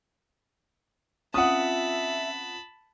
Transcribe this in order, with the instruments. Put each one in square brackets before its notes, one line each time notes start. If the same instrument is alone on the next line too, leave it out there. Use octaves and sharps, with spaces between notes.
[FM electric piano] C4 C#4 F4 [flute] E5 [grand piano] F#5 D#6 [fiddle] A5 B5